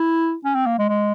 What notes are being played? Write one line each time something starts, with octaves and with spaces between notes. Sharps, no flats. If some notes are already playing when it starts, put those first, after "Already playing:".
Already playing: E4
C#4
C4
A#3
G#3
G#3